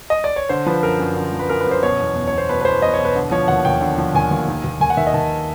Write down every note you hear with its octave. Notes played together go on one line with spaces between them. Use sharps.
D#5
D5
C#5
D3 C5
F3 B4
F#2 A#4
F#2
D3
F3
B4
F#2 A#4
B4
F#2 C5
B2 C#5
E2
E2
B2 C#5
C5
B2 B4
B4
E2 C5
E2 D#5
C#5
B2
B4
D3
F3 C#5
D#2 F#5
D#2 G5
D3
F3
D#2 G#5
D#2
D#3
D#2
D#2 G#5
F#5
D#3 E5
D#5
D#3 A5